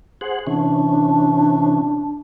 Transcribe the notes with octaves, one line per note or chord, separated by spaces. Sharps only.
G#4 C5 F#5
C3 E3 C#4 D4